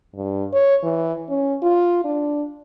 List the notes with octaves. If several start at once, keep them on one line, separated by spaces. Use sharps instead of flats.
G2
C#5
E3
C#4
F4
D4